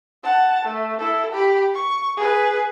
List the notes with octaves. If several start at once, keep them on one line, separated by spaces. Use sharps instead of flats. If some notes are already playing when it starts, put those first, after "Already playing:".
F#5 A5
A3
E4 A4
G4 B5
C#6
G#4 B4